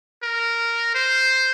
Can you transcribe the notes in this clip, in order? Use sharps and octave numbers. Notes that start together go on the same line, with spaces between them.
A#4
C5